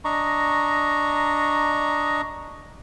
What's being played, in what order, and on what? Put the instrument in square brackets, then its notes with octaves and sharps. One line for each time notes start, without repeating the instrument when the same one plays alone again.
[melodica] D4 D#5 A#5 C#6